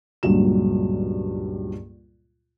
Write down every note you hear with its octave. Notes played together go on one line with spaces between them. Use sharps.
C#2 G2 A#2 F#3 E7